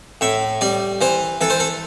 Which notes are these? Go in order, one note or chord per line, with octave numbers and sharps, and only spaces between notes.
A2 E5
G3 D5
E3 C5
E3 A4
C5
A4